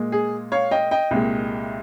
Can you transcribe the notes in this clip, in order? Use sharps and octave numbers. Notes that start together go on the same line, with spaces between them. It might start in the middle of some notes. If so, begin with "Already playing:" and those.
Already playing: A#2 G#3
G#4
C#5 F5
D#5 G5
D#5 G5
C2 A#2 G#3